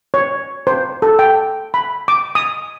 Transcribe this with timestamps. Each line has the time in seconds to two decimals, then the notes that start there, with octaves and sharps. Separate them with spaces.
0.14 C#5
0.67 C5
1.02 A4
1.19 G5
1.74 B5
2.08 D6
2.35 D#6